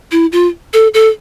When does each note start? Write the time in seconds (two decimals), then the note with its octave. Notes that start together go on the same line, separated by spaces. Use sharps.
0.12 E4
0.32 F4
0.73 A4
0.94 A4